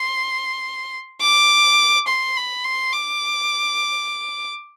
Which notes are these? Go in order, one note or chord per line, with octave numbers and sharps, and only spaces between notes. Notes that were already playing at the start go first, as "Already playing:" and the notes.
Already playing: C6
D6
C6
B5
C6
D6